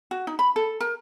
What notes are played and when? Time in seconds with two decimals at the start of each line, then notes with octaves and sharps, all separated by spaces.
0.11 F#4
0.27 D#4
0.39 B5
0.56 A4
0.80 A#4